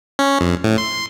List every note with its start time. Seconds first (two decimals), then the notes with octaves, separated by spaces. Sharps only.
0.19 C#4
0.41 F2
0.64 A2
0.78 C6